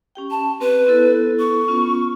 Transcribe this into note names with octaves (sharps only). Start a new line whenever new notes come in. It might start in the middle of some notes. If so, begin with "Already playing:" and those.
C#4 G4 G5
A5
C4 B4
B3 E4 A4
C#6
B3 C#4 F4